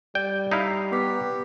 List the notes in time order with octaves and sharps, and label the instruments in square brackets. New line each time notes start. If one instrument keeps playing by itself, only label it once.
[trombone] G3 [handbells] D5 [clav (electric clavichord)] G5
[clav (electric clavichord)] D#4 E4 F5 [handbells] A#5 C7
[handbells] B3 B4 B6 [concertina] G4